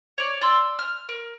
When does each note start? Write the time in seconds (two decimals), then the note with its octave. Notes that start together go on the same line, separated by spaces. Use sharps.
0.18 C#5 D5
0.41 D5 C6 E6
0.79 F6
1.09 A#4